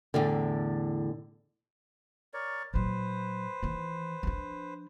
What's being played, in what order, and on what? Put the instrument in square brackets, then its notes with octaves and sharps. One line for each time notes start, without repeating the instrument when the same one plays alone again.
[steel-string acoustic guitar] E2 A2 D3
[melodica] A#4 C#5 D5
[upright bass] A#2 F#3 [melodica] B4 C5
[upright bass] D#3 E3
F3 D4